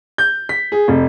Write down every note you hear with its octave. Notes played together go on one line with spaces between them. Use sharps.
G6
B6
G#4
F1